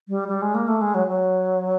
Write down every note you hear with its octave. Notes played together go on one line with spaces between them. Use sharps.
G3
G3
G#3
A#3
A3
G#3
F#3
F#3